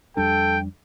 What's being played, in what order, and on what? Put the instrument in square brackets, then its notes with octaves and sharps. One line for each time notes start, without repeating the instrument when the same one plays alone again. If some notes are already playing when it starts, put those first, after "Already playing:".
[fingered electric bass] F2 G3 D4 [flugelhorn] A4 [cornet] G5